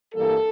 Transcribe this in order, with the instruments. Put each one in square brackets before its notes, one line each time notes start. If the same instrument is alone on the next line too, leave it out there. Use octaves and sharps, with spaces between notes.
[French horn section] G2 E3 G3 A#3 A4